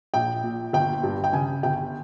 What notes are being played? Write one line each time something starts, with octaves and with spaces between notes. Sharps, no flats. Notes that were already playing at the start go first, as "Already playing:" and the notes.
A#1 G5
A#2
G1 G5
G2
G5
C#3 G#5
G1 G5